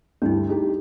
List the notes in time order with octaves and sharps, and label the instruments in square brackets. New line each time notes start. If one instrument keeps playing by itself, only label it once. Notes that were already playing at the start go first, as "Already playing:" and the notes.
[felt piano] D2 G2 [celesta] D4 E4
[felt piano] D#4 G4